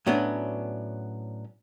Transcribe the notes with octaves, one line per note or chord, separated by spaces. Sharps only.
A2 F#3 B3 C#4 D4